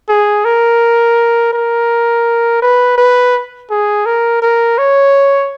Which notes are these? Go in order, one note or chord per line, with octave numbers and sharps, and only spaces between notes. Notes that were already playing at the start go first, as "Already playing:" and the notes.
G#4
A#4
A#4
B4
B4
G#4
A#4
A#4
C#5